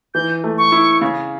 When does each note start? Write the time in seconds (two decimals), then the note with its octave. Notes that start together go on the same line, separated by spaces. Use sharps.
0.14 E3 G6
0.44 A3
0.58 C#6
0.72 E4
1.01 C#3